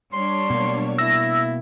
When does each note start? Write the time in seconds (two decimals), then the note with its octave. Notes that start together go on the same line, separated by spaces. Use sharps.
0.13 G3 D4 C#5 C6
0.50 B2 A#3
0.98 E4 E6 A#6